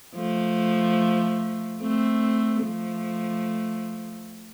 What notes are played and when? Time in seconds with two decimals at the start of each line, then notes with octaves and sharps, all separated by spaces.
0.16 F3 A3
1.81 A3 C4
2.64 F3 A3